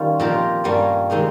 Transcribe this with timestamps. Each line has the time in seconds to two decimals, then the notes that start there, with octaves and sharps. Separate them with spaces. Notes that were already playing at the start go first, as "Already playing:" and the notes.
Already playing: D#3 G3 C#4 F4
0.19 A#2 F3 C4 G4 A#4
0.64 G2 G3 A#3 C#4
1.10 C3 D#3 G#3 D#4